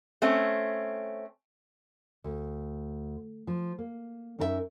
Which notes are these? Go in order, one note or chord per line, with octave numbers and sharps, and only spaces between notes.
A3 C4 C#4
D2
F3
A#3
F#2 C#4 D#4 A#4 C5 E5